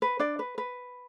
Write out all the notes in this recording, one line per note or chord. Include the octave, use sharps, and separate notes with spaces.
B4
D4 D5
B4
B4